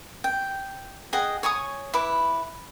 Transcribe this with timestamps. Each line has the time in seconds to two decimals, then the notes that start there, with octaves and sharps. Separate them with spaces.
0.24 G5
1.13 G#4 D#5 F#5 G5
1.43 C#5 G#5 C#6 D#6
1.94 E4 B4 D6